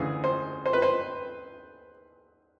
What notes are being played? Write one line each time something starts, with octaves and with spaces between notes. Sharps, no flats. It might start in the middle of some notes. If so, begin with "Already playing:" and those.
Already playing: D2 C#3 E3 G#4
C5
C5
B4
C5